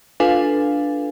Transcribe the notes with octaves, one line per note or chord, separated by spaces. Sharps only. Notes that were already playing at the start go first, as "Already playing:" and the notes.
D4 F4 A4 B4 F5 G#5